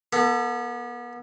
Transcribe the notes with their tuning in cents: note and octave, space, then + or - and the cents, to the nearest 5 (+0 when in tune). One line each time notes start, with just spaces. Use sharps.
B3 -35 A4 +25